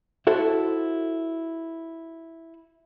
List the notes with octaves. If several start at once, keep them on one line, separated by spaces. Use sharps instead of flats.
E4 F#4 A4 C5